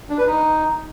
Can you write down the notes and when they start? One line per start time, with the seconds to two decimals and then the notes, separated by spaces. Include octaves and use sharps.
0.10 D4
0.18 B4
0.27 D#4